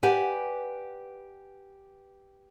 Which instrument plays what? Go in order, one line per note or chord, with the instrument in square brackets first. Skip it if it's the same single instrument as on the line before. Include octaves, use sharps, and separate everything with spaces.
[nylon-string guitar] G4 B4 D5 F#5 G#5